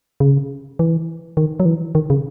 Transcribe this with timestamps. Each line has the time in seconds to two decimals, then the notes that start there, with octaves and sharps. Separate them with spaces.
0.20 C#3
0.79 E3
1.37 D#3
1.60 F#3
1.65 E3
1.95 D#3
2.10 C#3